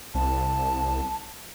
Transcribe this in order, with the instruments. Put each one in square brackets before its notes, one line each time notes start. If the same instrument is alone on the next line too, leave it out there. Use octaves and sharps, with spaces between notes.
[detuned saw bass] C2 [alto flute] A5